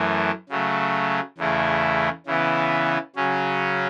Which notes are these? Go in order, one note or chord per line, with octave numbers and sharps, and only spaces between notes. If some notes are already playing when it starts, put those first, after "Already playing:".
Already playing: F#2 E3 A3
C#3 F#3 A3
E2 C#3 A3 E4
C#3 E3 B3 E4
C#3 F#3 C#4